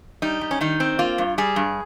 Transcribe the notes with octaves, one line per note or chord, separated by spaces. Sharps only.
G3 D#4
G3
C#4
D#3 D#4
C4
A#3 F4
G2
G3 G#4
G2